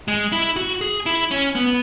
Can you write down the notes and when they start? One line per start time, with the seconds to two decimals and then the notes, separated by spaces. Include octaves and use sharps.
0.08 G#3
0.32 E4
0.56 F#4
0.81 G#4
1.06 E4
1.31 C#4
1.55 B3